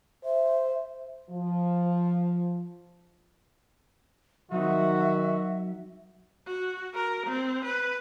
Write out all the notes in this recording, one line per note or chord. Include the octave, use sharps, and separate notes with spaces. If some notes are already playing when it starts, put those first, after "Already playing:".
C5 E5
F3
D#3 F#3 C4 D#4 F#4 E5
F#4
A#4
C4
B4